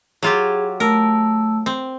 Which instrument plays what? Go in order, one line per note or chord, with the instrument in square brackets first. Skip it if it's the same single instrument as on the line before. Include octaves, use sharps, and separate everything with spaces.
[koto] F#3 F4 G4 [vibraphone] G#4
[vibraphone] A3 A5 E6 [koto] A#4
[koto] C4